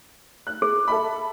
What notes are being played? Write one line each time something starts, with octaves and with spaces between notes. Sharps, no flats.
F#6
G#4
A4 E5 B5